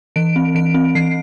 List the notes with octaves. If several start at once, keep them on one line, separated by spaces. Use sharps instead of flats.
E3 D7
C4
E3 D7
C4
E3 C7